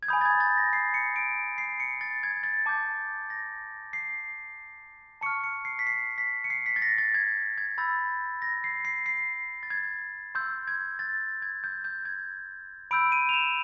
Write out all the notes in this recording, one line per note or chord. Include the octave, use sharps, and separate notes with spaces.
G#6
G#5 B5 D#6 G6
A6
G#6
A6
A#6
C7
C#7
D7
C7
C#7
A6
G#6
A6
A5 D6 G6
A#6
C7
A5 C#6 F6 C#7
C#7
C7
B6
C7
B6
C#7
C7
B6
A6
A#6
A6
G#6
G#6
B5 E6 G6 A6
A#6
C7
C7
C7
A6
G#6
C6 E6 G6
G#6
A6
G#6
G6
G6
G#6
B5 E6 G6 D7
D#7
F7
E7